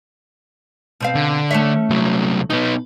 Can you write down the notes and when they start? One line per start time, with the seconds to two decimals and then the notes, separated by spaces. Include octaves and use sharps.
1.00 B2 C4 F5
1.15 D3
1.51 A3 C#4 E5
1.90 C2 F#3
2.50 B2 B3 D#4